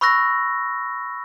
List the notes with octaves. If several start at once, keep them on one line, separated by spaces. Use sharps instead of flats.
B5 C#6 E6 F#6 A#6